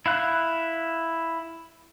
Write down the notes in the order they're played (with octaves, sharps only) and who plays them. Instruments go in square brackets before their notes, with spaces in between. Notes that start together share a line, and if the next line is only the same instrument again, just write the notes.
[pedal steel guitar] E4 F5 F#6